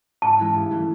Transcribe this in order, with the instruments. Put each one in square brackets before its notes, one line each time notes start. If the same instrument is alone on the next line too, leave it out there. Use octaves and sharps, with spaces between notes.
[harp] G#2 [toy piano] A5
[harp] E3 G#3 C#4 E4
G2
E3 A3 C#4